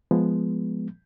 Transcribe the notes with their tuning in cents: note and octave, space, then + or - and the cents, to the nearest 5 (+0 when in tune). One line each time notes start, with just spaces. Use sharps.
F3 -5 G#3 +0 B3 +0